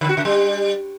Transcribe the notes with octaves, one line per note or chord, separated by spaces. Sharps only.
D3
F#4
C#3
G3